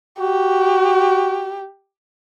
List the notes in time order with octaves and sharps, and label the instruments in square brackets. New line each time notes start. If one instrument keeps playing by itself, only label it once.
[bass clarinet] F#4 [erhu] G4